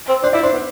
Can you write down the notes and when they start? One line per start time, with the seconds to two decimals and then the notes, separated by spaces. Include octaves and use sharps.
0.09 C4
0.23 D4 C5
0.33 E4 D5
0.43 D4 C5
0.53 B3